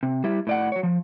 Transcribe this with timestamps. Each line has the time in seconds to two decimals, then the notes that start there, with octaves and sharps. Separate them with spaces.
0.03 C3
0.24 G3 E4
0.47 A2 D5 F#5
0.72 F#3 C#5
0.83 F3